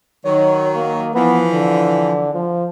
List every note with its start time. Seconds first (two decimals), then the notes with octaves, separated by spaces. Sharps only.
0.25 D#3 F#3 C#5
0.75 A#3
1.15 E3 F3 B3
1.53 D3
2.34 F3